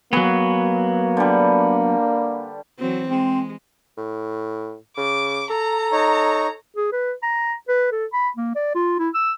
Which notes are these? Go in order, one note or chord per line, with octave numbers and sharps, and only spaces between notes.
F#3 A#3 B3 F#4 G#4 B4
D3 G3
E3 F#3 C4
G#3 C4
A2
C#3 D6
A4 A#5
D#4 C#5
G#4
B4
A#5
B4
A4
B5
A#3
D5
F4
E4
E6